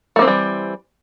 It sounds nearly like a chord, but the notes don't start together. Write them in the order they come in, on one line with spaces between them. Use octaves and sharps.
A3 A#3 C4 E3 G3